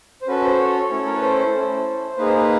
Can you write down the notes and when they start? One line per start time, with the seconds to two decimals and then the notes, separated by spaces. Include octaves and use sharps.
0.22 C5
0.27 C#4 F#4 A4 B4
0.44 C5
0.59 C#5
0.91 A3 C#4 E4 A4
1.06 A#4
1.15 B4
1.22 C5
1.54 C#4 E4 A4
2.17 A#3 D#4 G#4 B4
2.27 C5
2.36 B4